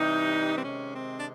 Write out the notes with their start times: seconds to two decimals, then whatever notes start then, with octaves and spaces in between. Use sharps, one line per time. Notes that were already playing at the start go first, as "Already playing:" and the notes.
Already playing: C3 E3 G3 D#4
0.57 C4
0.64 C3 D#3 G#3 C#4
0.94 C4
1.19 D4